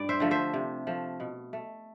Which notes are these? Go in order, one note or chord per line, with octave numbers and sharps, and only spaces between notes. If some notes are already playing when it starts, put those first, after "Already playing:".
Already playing: G2 D5
C5 E5
D3 F3 A3
C5 E5
C3
F3 A3
B2
A3